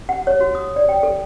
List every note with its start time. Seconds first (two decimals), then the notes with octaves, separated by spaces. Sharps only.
0.09 F#5
0.27 C#5
0.40 F#4
0.55 D#6
0.76 D5
0.89 G5
1.03 A4